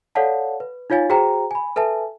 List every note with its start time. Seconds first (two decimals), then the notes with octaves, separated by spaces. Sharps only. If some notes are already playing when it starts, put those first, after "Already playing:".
0.15 A4 C#5 D5 F5 F#5 A5
0.60 B4
0.90 D#4 F4 C#5 F5 G#5 A6
1.10 F#4 G#4 C5 G5 A#5
1.51 G#5 B5
1.76 A4 B4 E5 G#5 A5